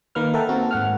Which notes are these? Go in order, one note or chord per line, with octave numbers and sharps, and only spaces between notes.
D#3 A#3 B4 F6
A4 A#4 E5 F#5 G5 A5
A#3 C4 F#4
G#2 F#5 F6